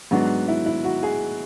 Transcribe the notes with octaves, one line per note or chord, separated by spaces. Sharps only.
G#2 F#3 B3 D4 F#4
E4
E4
F#4
G#4